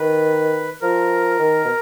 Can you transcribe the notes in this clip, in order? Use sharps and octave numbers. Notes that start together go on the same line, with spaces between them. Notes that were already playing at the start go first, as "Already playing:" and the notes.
Already playing: D#3 B4
F3 A#4
D#3
B2